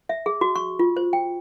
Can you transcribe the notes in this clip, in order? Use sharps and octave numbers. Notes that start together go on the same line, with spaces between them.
E5
G#4
F#4
C#6
F4
C5
G5